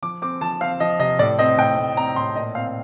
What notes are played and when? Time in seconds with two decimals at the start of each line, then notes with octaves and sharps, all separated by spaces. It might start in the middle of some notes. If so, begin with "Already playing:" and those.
0.02 F3 D6
0.22 C4 D6
0.41 F3 A5
0.61 C4 F5
0.80 F3 D#5
0.99 C3 D#5
1.19 A2 D5
1.39 C4 D#5
1.58 A2 G5
1.78 A2
1.97 C4 A#5
2.16 A2 C6
2.35 A#2 D#5
2.55 C4 F5